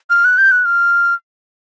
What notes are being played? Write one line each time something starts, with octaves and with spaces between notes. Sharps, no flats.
F6
F#6
G6
F#6
F6